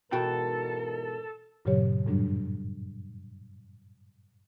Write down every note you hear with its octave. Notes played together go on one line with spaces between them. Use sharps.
G#2 B2 E3 F#4 A4 A#4 G5
G2 A#2 C#3 F#3 G4 C#5
F#2 A2 F#3 G3 D4